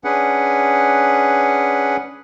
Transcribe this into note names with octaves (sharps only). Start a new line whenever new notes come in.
C#4 D4 G#4 B4 F#5